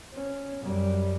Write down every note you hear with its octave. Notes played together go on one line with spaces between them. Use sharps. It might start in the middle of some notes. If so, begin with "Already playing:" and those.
C#4
F#2 G3